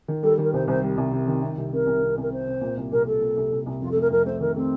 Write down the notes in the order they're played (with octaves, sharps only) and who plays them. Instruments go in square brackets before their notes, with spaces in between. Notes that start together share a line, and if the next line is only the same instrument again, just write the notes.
[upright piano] D#3
[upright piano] G3 [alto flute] A4
[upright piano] D#3
[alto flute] A#4
[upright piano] C2 [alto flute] C5
[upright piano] C2 [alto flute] C5
[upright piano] G3
C2
C3
D#3
C3
C2
[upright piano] C3 [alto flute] A#4
[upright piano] C2
C3
[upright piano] C2 [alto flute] A#4
[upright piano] C3 [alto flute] C5
[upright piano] C3
A#2
C2
[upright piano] C2 [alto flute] A#4
[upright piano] A#2 [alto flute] A4
[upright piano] A#2
C2
C2
C2
[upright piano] F2 [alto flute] F4
[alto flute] A4
[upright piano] A3 [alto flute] A#4
[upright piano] F2 [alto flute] A#4
[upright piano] A3 [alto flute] C5
[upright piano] D#3 [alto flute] A#4
[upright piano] A3 [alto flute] C4